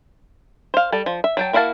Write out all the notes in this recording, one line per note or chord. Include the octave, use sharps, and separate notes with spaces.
C5 F5
G3 A4 A5
F3
E5
F#3 G5 A5
A#3 E4 F#4 F5 A5